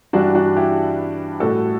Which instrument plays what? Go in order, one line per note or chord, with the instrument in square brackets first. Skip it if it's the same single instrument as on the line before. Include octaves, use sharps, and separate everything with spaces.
[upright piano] G2 E3 G3 D4 F#4
D4 F#4
E4 G4
A2 G3 F#4 A4